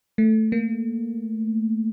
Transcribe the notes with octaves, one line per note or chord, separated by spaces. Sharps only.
A3
A#3